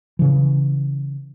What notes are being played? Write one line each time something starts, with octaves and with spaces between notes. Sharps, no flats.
C#3 E3